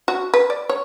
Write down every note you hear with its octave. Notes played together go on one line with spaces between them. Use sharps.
F#4
B4
D5
C#5